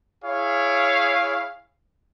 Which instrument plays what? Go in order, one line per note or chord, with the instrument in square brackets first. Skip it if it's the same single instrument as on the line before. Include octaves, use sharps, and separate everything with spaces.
[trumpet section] E4 G#4 C#5 F5